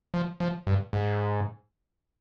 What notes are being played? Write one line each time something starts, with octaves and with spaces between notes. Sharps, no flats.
F3
F3
G2
G#2